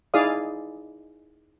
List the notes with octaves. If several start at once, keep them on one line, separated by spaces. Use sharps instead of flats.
D#4 E4 G#4 D5 F5 D#6